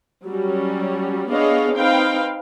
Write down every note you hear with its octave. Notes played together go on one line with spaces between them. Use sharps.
F#3 G3 C#4
B3 D4 G#4 C#5 D#5 F5
C4 D#4 B4 F5 G5